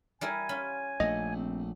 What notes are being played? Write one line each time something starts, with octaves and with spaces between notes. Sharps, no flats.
G3 E4 A#4 G#5
C#4 F4 B5
A#1 A3 D#5
C4